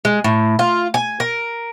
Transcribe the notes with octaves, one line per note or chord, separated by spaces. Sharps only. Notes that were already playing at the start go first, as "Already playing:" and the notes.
G#3
A2
F4
G#5
A#4